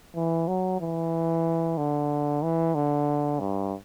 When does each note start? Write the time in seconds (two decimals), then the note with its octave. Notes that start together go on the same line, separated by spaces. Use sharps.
0.15 E3
0.48 F#3
0.80 E3
1.78 D3
2.43 E3
2.75 D3
3.40 G2